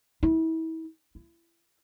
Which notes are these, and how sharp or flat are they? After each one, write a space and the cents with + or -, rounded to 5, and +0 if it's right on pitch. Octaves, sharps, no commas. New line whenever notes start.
E4 -35
E4 +30